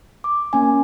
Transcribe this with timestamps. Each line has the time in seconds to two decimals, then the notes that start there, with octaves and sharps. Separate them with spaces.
0.24 D6
0.53 A#3 C#4 G#5